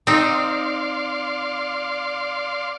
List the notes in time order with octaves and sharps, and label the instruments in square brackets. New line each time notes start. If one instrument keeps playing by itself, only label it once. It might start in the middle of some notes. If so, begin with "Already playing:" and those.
[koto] C4 D#4 [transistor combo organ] D5 F5 C6